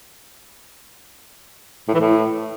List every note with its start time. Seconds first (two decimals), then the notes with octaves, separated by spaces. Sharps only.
1.88 A2
1.94 E3
2.00 A2